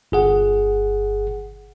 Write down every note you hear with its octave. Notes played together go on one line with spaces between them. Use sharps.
G1 G#4 F#5